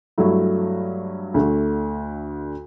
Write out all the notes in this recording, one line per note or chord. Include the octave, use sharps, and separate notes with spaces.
G2 F#3 A3 E4
D2 D3 A3